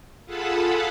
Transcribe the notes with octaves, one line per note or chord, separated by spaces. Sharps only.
F4 G#4 A4 F#5 A5 B5